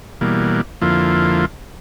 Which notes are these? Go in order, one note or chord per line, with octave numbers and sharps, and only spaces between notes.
B2 E3 G3 A#3
F2 D3 F3 A#3 E4 F4